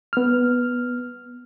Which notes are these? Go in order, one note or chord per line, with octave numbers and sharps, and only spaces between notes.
B3 F6